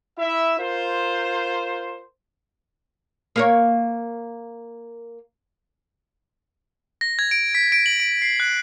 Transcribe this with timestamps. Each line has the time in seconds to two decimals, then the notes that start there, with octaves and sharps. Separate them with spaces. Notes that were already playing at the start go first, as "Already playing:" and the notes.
0.19 E4 E5
0.59 F4 A#4 C5
3.36 A#3 A#4 C#5
7.01 A#6
7.19 G#6
7.31 D7
7.55 B6
7.72 D7
7.86 F#7
8.00 D7
8.22 C7
8.40 F#6